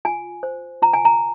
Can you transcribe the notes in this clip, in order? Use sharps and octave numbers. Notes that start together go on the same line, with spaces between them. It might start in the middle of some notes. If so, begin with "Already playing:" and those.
F4 G#5
C5
F4 A#5
G#5
A#5